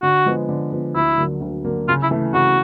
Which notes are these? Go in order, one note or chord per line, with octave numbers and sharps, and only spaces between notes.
D3 F#4
F3 G#3 B3
D3
F3 G#3 B3
D2 E4
D3 F#3 A#3
D2
D3 F#3 A#3
C#3 F4
E4
E3 A3
C#3 F#4